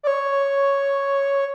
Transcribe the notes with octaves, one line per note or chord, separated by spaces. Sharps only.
D5
C#5